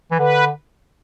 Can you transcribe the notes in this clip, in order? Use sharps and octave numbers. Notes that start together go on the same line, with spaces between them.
E3
D3 B4